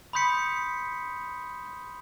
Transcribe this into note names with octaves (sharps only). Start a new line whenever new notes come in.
B5 C6 D#6 G6 B6 C#7